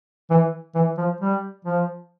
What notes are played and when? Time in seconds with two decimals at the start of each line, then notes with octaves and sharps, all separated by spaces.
0.30 E3
0.75 E3
0.98 F3
1.21 G3
1.65 F3